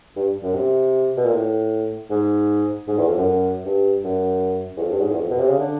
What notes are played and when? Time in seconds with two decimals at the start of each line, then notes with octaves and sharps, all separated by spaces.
0.16 G2
0.43 F#2
0.55 C3
1.17 B2
1.25 A#2
1.33 A2
2.11 G#2
2.88 G#2
2.98 E2
3.08 F2
3.18 F#2
3.66 G2
4.04 F#2
4.77 E2
4.82 F2
4.91 G2
5.01 G#2
5.11 E2
5.20 F2
5.30 B2
5.40 C3
5.49 C#3
5.59 D3